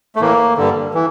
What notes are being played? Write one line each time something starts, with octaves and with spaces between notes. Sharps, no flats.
A3
A2 E3 A#3
G2 D3
E3